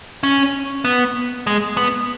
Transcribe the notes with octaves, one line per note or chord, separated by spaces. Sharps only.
C#4
B3
G#3
B3